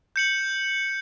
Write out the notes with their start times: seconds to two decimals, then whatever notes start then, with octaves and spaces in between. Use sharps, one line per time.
0.16 G6 C#7 F#7